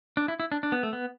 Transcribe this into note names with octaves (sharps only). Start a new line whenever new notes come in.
D4
E4
E4
D4
D4
B3
A3
B3